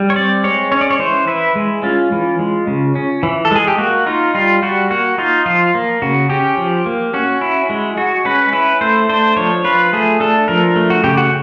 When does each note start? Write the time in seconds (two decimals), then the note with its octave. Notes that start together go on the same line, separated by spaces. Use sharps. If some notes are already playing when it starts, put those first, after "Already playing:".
Already playing: G3
0.10 C#5
0.16 C4 D5
0.44 G#3 C#5
0.72 C#4 C#5
0.81 D5
0.91 C#5
0.99 E3 C5
1.28 E4 B4
1.56 G#3
1.83 C#4 F4
2.12 E3
2.39 G#3
2.67 C#3
2.95 C#4
3.23 E3
3.45 A4
3.51 G#3 G#4
3.67 G4
3.78 A#3 F#4
4.06 D#4 F4
4.34 G3 F4
4.62 G3 F#4
4.91 A#3 F#4
5.18 D#4 F4
5.46 F3 F4
5.75 A#3
6.02 C#3 F#4
6.30 C#4 G4
6.57 F3
6.86 A#3
7.14 C#4 F#4
7.41 E4
7.70 G#3
7.97 G#3 F#4
8.25 C#4 B4
8.53 E4 B4
8.81 A3 C5
9.09 D4 C5
9.36 F3 C#5
9.64 F4 B4
9.93 A3 G#4
10.20 D4 A4
10.48 F3 A#4
10.76 A3
10.90 F#4
11.04 C#3 G4
11.17 F#4